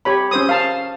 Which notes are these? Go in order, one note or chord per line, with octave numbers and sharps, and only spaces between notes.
G4 C#5 B5
C#4 C5 D#6
F5 A5